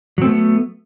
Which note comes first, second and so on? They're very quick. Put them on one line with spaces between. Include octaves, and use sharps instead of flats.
F#3 C4 A3 B3